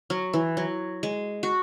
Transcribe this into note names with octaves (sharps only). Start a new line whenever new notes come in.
F#3
E3
F#3
G#3
F#4